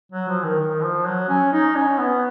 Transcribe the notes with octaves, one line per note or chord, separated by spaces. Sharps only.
F#3
F3
D#3
D#3
F3
F#3
C#4
D#4
C#4
B3